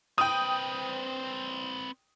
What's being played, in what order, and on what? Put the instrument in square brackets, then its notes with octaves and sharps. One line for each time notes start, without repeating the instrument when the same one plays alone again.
[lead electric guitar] C4 B4 [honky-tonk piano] G5 D#6